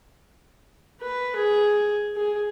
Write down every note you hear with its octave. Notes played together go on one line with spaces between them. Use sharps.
B4
G#4
G#4